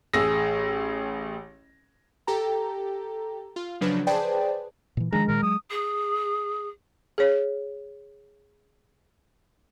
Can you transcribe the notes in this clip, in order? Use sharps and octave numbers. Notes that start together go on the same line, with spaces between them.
A1 G#4 D#6 E6 A#6
G4 A4 G5 A#5
F4
C#3 F3 F#3 D4 B4
G#4 B4 C5 D5 G5 A5
A#2 E3
D#3 F3 G#3 D4 A#5
A#2 D#3 A#4
F#3 D#6
G#4
G#4 C#5